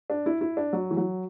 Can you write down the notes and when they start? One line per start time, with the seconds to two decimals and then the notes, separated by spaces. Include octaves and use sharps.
0.10 D4
0.26 E4
0.41 E4
0.57 D4
0.73 F#3
0.91 E3
0.97 F#3